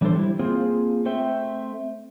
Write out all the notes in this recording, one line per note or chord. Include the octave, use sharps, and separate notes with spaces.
E3 G3 D4 G#4 A4 C5
G3 E4
A#3 C4 F4 G#4 C5
A3 C4 C5 E5 G5